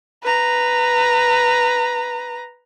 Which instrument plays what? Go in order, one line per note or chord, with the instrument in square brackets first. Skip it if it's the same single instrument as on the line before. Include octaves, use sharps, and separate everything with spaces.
[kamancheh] B4 A#5